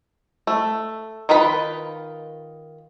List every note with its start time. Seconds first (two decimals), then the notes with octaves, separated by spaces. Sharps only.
0.47 A3
1.29 D#3 D#4 F4 B4 B5